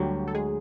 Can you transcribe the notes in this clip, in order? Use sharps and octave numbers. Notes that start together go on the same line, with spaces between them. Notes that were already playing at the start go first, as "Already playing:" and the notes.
Already playing: D2 D3 F#3 G3 G4
A4
G#3 G#4